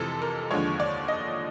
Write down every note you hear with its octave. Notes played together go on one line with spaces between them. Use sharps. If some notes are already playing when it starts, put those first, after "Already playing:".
Already playing: F2 C3 E3 G#3 A4
A#4
D#2 D3 F3 G#3 C#5
D5
D#5